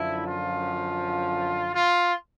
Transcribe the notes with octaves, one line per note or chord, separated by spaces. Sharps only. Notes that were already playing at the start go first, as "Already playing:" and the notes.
Already playing: F#2 D3 F3 E4
F4
F4